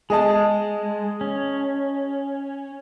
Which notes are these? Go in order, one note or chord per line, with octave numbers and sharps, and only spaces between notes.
G#3 G#4 D#5 A5
C#4